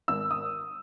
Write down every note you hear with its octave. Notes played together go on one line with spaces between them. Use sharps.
G#1 E6
D#6